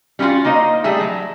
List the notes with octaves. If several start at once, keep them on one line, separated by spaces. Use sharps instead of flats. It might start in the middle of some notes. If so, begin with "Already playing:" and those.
G3 C#4 D#4 F4 F#4
A#3 D#4 C5 D#5
G3 A3 G#4 E5
F#3